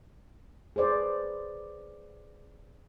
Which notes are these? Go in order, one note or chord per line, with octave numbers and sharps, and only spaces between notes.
G#4 B4 C5 D5